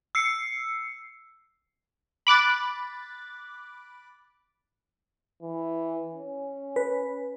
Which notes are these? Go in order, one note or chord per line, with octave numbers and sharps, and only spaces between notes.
E6 C7 C#7
B5 D6 F#6 A6
E3
C#4
B4